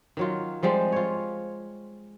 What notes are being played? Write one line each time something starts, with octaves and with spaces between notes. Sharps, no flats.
D#3 F#3 F4
F3 G3 G#3 C4
F4 C#5